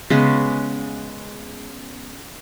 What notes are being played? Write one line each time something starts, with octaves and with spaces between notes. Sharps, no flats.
C#3 G#3 B3